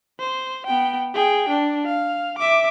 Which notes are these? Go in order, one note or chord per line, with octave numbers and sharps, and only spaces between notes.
C5
B3 G5
G#4 G5
D4
F5
E5 D6